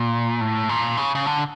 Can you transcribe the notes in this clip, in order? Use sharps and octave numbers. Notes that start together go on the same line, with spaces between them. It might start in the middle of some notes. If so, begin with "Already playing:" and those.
Already playing: A#2
A2
A#2
C#3
C#3
D3